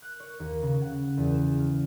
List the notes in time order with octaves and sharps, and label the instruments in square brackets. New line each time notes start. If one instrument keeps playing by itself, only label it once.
[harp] F#6
C#5
D#2
C#3
F#5
E2
E7
F6